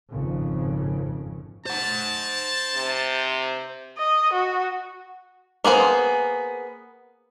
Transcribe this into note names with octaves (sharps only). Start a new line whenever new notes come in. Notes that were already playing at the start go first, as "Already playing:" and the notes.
G#1 F2 C#3
C5 F#5 A5
C3
D#5
F#4
A#3 B3 G#4 C5